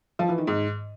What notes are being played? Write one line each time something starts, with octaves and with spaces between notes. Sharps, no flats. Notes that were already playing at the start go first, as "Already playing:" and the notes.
F3
E3
D#3
G#2